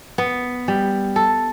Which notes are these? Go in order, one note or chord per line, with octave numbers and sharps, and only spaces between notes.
B3
G3
A4